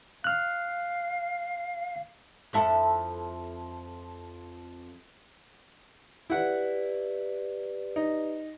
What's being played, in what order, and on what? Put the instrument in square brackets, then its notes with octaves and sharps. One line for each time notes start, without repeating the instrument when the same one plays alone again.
[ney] F5 [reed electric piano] F6 F#6
[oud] F2 E4 A4
[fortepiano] E4 F#5 [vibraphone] G4 B4 D5
[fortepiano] D#4